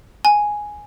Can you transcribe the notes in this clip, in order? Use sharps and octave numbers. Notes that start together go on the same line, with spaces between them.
G#5